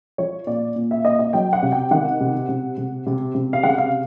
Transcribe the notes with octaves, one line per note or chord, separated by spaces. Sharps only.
F3 C#5
A#2 D5
A#2
E5
A#2 D#5
D#5
F#3 G5
F#5
C3
G5
D#3 F#5
C3
C3
C3
C3
C3
F5
C#3 F#5
F5